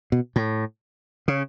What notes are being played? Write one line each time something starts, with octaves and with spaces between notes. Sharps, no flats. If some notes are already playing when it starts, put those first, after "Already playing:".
B2
A2
C#3